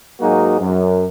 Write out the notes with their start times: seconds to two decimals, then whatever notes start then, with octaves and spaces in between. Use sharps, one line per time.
0.20 G#2 F#3 A#3 D#4 F#4 G#4
0.60 F#2